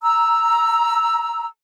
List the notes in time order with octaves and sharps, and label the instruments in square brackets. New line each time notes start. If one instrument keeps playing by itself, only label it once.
[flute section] A#5 E6